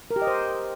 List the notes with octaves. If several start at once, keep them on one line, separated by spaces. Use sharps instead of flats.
A#4
G4
D#5
C5